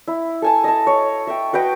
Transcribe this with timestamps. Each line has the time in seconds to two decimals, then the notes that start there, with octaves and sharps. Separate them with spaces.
0.08 E4
0.42 A4 G#5 A5
0.64 D#5 A5
0.87 C#5
1.27 E5 G5
1.53 F#4 B4 D#5 G5